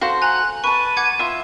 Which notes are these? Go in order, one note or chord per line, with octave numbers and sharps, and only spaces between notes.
F#4 A4 C5 F5
G#5 A#5 F#6
B4 A5 C#6 D#7
F#5 D6 G#6
F4 E5